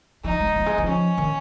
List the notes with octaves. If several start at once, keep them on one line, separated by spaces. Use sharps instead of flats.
F3 D#4
G#3
F3
G#3
F3
C#4
D#3